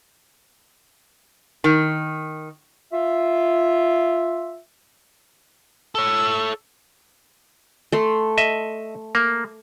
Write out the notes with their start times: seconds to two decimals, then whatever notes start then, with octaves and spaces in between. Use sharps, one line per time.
1.64 D#3
2.92 F4 E5
5.95 A4 C#5 E6
7.92 A3 C6
8.38 D#5 E5
9.15 A#3